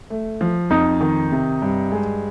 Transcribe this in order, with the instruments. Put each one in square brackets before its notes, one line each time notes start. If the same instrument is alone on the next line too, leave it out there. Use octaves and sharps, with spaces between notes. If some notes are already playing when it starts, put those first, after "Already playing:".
[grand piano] A3
F3
[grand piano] F2 [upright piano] D#4
[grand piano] D#3
C3
G2
G#3